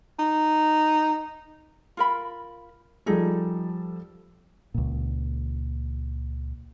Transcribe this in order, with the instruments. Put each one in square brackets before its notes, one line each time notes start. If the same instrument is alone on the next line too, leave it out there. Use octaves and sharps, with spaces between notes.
[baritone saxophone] D#4
[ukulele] F4 A#4 B5
[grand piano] F3 G3 A4 [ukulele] D#4 G#4
[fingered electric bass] C#2 A#2